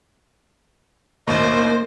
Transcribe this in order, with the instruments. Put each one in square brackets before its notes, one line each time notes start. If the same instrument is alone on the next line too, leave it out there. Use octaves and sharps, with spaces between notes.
[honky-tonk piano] A1 D#2 B2 [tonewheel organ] A#3 [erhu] C5 [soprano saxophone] D#5